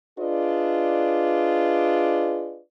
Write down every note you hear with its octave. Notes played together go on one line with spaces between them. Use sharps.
D4 F4 G#4 B4 D5 D#5